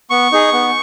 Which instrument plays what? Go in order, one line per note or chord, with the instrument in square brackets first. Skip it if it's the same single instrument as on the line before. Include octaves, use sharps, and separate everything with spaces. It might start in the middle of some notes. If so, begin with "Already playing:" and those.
[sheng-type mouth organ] B3 C#6
D#4 G#4
B3